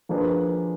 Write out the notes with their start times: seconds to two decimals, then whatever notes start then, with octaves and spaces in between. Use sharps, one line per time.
0.09 F3 A#3 D4 G#4 B4